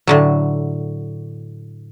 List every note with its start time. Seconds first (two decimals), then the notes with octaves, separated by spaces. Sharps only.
0.07 A2 D3 F#3